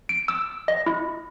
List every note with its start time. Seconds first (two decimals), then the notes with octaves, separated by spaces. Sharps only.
0.09 D7
0.28 E6
0.68 D#5
0.86 E4